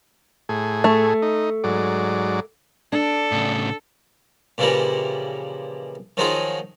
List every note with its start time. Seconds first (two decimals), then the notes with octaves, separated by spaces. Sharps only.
0.49 A2 G#4
0.84 A3
1.22 D#4
1.64 G#2 F#3 D5
2.92 D4 A4
3.32 A2 C#3
4.58 A#2 C#3 E3 F3 G3 A#3
6.17 D#3 F3 F#3 D#4 F4 G#4